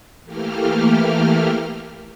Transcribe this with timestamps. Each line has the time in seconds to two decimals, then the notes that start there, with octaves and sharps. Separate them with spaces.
0.25 E3 A3 A#3 G4 F6